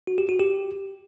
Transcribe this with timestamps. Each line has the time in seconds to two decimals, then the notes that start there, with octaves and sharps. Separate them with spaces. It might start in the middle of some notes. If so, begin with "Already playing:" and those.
0.07 F#4
0.18 G4
0.29 F#4
0.39 G4